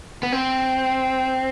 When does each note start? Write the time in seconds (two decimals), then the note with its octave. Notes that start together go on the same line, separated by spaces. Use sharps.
0.23 B3
0.32 C4